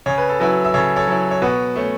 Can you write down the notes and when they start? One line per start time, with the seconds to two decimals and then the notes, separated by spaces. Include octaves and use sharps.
0.06 C#3 C#5
0.18 B4
0.29 A4
0.40 F#3 C#4 E4 F#4 B4
0.65 E5
0.74 C#3 A4 C#5
0.96 A4 C#5
1.07 F#3 C#4 E4
1.31 C#5
1.42 B2 F#4 B4
1.76 A3 C#4